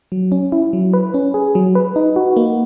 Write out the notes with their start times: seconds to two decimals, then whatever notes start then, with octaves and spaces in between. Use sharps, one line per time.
0.12 F#3
0.32 C#4
0.52 E4
0.73 F#3
0.93 B4
1.14 C#4
1.34 G#4
1.55 F#3
1.75 B4
1.96 D#4
2.16 F#4
2.36 A#3